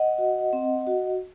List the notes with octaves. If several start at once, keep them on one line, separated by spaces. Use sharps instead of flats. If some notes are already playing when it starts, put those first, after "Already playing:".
Already playing: D#5 F#5
F#4
C4
F#4